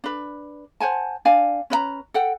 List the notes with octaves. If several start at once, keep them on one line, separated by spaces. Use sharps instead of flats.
D4 B4
C5 F#5 G#5 A5
D4 D5 F5 G#5
C#4 B4 D#5 A#5
A4 F#5 G5